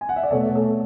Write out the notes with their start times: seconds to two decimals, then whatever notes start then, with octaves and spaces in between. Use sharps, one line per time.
0.01 G#5
0.09 F#5
0.16 E5
0.23 D5
0.31 B2 A3 A4 C#5
0.55 A4